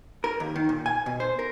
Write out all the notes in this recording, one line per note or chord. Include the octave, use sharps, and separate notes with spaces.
A#4
D#2
D#3
A#2
G#5
B2
C5
A#4